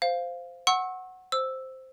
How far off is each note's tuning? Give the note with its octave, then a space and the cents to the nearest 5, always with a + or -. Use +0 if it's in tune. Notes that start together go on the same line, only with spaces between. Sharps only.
C5 -10 F5 +0
F#5 +0 C#6 -35 E6 -15
C5 +0 E6 +0